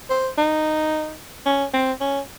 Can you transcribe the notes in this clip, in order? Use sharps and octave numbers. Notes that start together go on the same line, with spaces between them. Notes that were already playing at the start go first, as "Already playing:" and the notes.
C5
D#4
C#4
C4
C#4